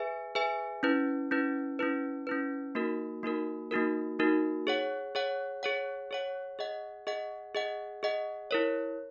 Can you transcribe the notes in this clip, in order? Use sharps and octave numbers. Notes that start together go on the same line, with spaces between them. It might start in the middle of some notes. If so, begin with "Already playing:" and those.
Already playing: G#4 B4 E5 G#5
G#4 B4 E5 G#5
C#4 E4 B4
C#4 E4 B4
C#4 E4 B4
C#4 E4 B4
A#3 D#4 F#4 A#4
A#3 D#4 F#4 A#4
A#3 D#4 F#4 A#4
A#3 D#4 F#4 A#4
G#4 C#5 F#5
G#4 C#5 F#5
G#4 C#5 F#5
G#4 C#5 F#5
G#4 D#5 F#5
G#4 D#5 F#5
G#4 D#5 F#5
G#4 D#5 F#5
E4 A#4 C#5